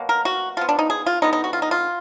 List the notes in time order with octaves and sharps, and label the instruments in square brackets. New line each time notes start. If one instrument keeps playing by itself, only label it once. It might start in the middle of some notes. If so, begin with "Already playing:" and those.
Already playing: [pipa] B2 F#3 A#3
A#4
F#4
F3 B3 F4
D4
D#4
G#4
F4
D3 G#3 B3 D#4
D#4
F#4
F4
D#4
F4